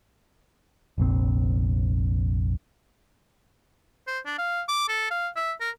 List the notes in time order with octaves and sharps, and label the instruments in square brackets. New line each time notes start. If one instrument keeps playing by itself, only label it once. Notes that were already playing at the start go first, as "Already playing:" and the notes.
[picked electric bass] F1 A#1 C4
[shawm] C5
D4
F5
D6
A4
F5
E5
A#4